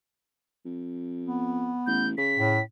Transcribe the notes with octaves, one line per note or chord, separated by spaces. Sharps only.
F2
B3
A1 G6
C#3 B6
A2